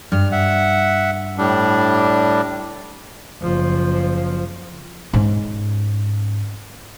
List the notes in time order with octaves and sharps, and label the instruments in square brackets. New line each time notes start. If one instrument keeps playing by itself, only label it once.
[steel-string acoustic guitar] G2 [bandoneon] F6
[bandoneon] E5 F#5
A2 G3 D4
[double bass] F#1 F3
[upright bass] G#2 C#4